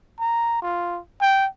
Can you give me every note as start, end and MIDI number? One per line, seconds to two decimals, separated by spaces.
0.19 0.61 82
0.62 1.00 65
1.21 1.47 79